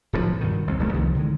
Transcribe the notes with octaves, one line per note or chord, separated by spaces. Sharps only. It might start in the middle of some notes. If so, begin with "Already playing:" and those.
D1 B1 C3 F3
G2 B2 D#3
C2
D#1 B1 A3
C2 D#3 F3
D3 D#3 G#3